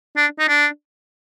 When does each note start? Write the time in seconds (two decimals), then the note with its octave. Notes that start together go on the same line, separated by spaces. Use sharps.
0.17 D4
0.40 D#4
0.48 D4